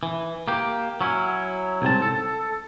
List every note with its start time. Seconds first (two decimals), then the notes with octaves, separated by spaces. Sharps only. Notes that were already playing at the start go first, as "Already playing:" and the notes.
0.03 E3
0.48 A#3 G4
1.01 F#3 C#4 E4
1.82 C2 G#2 C4 A5
2.02 A4